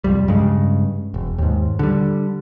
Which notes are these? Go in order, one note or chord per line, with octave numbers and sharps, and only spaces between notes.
C2 F2 G3
G2 C#3 G#3
E1
D#2 G#2
D3 G3